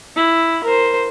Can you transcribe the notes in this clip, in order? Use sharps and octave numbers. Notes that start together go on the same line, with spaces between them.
E4
A#4 C5